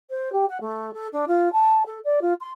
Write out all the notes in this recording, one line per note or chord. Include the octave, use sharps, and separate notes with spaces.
C5
G4
F#5
A3
A4
D4
F4
A5
A4
D5
F4
C6